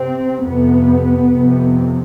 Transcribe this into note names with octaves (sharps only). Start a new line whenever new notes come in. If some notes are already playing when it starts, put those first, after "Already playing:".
Already playing: C3 C4
F2 C3 B3
F2 C3